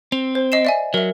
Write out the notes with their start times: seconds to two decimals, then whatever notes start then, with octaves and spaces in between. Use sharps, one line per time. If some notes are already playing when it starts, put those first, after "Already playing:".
0.12 C4 F7
0.35 C5
0.52 D#5 C7 E7
0.65 D5 E5 G#5
0.94 F#3 A#4 E5